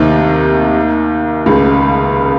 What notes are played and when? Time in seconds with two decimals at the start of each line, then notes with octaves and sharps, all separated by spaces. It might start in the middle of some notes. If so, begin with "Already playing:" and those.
Already playing: D#2 C3 D#3
1.46 C#2 C#3